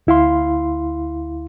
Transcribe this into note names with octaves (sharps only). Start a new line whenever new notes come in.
D2 E4 F5 C6